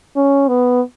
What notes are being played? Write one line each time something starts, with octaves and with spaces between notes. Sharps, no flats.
C#4
B3